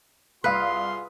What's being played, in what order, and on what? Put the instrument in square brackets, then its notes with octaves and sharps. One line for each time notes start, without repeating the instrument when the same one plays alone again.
[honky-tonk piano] C2 F5 D#6 [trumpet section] F4 G#4 C6 [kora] B4